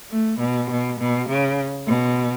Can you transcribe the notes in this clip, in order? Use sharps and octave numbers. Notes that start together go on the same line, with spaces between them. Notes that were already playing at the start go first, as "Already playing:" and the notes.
A3
B2
B2
B2
C#3
B2